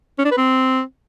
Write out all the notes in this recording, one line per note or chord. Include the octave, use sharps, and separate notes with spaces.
C#4
D4
B4
C4